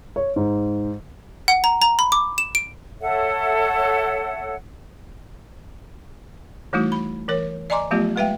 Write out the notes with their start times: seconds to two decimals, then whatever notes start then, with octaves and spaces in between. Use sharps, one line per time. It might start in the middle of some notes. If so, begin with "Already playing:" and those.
0.16 C#5
0.36 G#2
1.48 F#5
1.64 A#5
1.82 A#5
1.99 B5
2.12 D6
2.38 E7
2.55 D7
3.01 A4 C#5 E5 F#5
6.73 E3 G3 A3 D#4 E4 F#4
6.92 B5
7.28 E3 A#4 C#5
7.70 D5 D#5 G#5 A#5 C6 D6
7.91 F3 F#3 A3 B3 F4 G4
8.16 G3 G#3 B4 E5 F5 G5